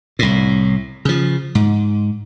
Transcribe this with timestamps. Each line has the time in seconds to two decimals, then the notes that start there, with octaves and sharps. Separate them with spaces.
0.19 C2 A2
1.05 C#3 F3
1.55 G#2